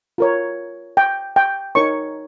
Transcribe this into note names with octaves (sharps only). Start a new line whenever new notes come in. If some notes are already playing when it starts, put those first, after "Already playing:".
F4 A#4 C#5
G5
G5
D#4 A#4 C#5 C#6